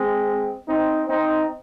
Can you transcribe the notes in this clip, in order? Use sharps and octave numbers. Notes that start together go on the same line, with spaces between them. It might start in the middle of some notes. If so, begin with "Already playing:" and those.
Already playing: G#3 C4
C4 D#4
C4 D#4